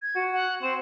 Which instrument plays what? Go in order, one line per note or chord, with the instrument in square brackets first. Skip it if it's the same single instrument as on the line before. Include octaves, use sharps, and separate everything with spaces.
[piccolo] G#6
[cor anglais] F#4
[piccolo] F#5
[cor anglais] C4 [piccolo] E7